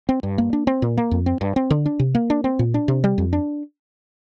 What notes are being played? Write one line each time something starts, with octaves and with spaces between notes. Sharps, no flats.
C4
G2
A#3
D4
C4
A#2
A#3
F2
C4
G2
C4
D3
D4
C3
A#3
D4
C4
A#2
D4
C3
G3
F2
D4